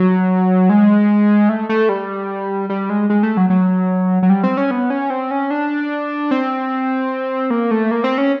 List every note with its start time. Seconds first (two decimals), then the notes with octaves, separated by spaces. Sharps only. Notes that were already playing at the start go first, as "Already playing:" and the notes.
Already playing: F#3
0.69 G#3
1.49 A3
1.69 A3
1.89 G3
2.70 G3
2.90 G#3
3.10 G#3
3.23 A3
3.37 F#3
3.50 F#3
4.23 F#3
4.30 G3
4.44 C4
4.57 C#4
4.71 B3
4.90 C#4
5.10 C4
5.31 C#4
5.51 D4
6.31 C4
7.50 A#3
7.71 A3
7.91 A#3
8.04 C4
8.18 C#4